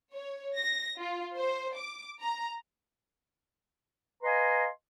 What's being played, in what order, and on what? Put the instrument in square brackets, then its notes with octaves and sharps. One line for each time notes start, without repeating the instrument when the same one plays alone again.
[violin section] C#5
A#6
F4
C5
D6
A#5
[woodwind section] B4 D#5 F5 G#5 A#5 C6